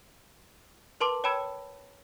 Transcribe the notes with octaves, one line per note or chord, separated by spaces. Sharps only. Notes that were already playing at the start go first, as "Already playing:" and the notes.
A#4 B4 A5 C6 D6
C#5 G5 A5 B5 E6 G#6